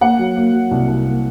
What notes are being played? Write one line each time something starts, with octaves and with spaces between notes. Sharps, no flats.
A#3 F#5
F#3
A#3
F#3
C2
C2
A#3